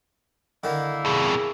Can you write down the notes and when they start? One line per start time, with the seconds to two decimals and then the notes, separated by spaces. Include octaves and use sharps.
0.64 D3 D#3 A#3 E4
1.05 F2 B2 G#4